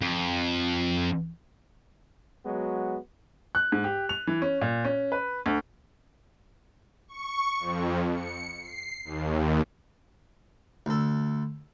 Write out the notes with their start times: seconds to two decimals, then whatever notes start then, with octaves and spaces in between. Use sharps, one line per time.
0.02 F2
2.45 F#3 G#3 B3 F#4
3.55 F#6
3.72 G#2
3.84 G4
4.09 F7
4.27 E3
4.42 C#4
4.61 A#2
4.85 C#4
5.12 B4
5.46 D2
7.08 C#6
7.59 F2
8.13 C#7
8.59 C7
9.04 D#2
10.86 D2 A4